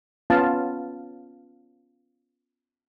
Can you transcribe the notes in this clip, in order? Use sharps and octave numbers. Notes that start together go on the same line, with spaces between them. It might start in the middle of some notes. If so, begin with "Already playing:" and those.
B3 C#4 F4 F5 A5